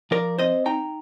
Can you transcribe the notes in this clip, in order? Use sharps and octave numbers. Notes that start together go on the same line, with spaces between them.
F3 A#4 D5
C4 C5 D#5
D#4 G5 A#5